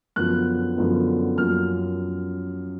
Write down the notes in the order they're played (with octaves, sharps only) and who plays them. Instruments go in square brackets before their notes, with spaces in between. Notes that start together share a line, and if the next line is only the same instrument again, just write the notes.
[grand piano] F#2 D3 F3 B3 F#6
F#2 D3 F3 B3
F#2 F3 A#3 F6